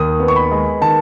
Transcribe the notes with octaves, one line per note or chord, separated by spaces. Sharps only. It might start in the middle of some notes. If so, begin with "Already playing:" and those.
Already playing: D#2 D#3 D#6
B3
C#6
B5
G#3
D#3 A5